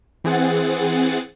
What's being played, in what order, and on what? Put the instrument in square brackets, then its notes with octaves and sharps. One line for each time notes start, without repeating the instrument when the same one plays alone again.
[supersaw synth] E3 C4 G#4 F#5 A6